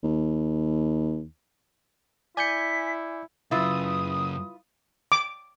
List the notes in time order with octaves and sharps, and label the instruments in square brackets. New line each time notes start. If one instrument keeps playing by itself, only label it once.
[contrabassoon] D#2
[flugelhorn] E4 [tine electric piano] D5 G6 C#7 [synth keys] G#5 [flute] B6
[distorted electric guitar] F#2 C#3 [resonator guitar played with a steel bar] E4 F4 B4 [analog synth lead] D#6
[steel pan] D6